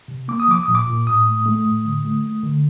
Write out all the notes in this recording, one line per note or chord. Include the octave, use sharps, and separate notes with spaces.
C3
A#3 D6
D#6
F3 D6
A#2 D#6
D6
A#2
A2 D#6
A3
A3
A2
D3
A3
A3
D3